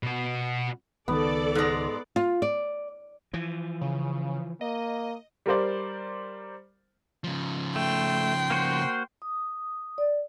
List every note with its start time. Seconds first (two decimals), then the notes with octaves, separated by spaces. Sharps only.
0.03 B2 F#4
1.08 C#2 D#3 B3 A4 D5
1.55 G#2 G#3
2.16 F4
2.42 D5
3.33 E3 F3
3.81 C#3
4.61 A#3 D#5
5.46 G3 A#4 C5 D5
7.24 C#3 F3
7.76 A3 G5 C6
8.50 A#3 F#4 C5
9.22 D#6
9.98 D5